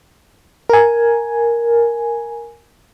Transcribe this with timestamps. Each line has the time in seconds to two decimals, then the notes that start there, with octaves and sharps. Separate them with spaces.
0.69 A#4 G#5